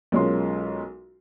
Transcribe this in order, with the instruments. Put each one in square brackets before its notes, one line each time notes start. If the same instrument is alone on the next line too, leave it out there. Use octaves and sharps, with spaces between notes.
[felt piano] B1 G#3 C#4 F4 A#4 C6